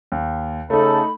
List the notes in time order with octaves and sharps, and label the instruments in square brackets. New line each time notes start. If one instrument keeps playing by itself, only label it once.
[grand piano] D#2
[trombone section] C#3 A4 [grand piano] A3 D#4 [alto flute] B5